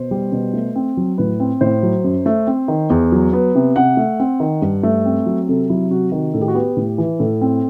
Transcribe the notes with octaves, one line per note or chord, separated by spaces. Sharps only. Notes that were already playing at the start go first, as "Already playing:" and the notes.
Already playing: B2 C5
G3
B2
A3
C4
F#3
A2 B4
C4
A2 C5
F#3
F#2
A3
C4
D#3
E2
F#3
B3
C3
C3 F#5
A3
C4
D#3
G2
A3
C4
F#3
C3 A4
F#3 E4
C3 F#4
D#3 F#4
A2 A4
G4
F#4
B3 G4
A2
E3
A2 A4
C4